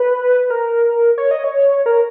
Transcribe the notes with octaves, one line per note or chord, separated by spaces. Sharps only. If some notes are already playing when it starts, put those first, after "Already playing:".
Already playing: B4
A#4
C#5
D#5
C#5
A#4